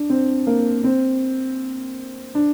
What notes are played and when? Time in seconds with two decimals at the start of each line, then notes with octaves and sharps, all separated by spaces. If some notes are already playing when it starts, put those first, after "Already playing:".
Already playing: D4
0.10 C4
0.47 A#3
0.84 C4
2.35 D4